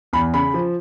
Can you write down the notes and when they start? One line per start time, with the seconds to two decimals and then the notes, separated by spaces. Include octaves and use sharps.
0.13 E2 B5
0.34 C#3 B5
0.54 F3